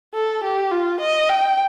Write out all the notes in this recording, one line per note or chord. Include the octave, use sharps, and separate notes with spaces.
A4
G4
F4
D#5
G5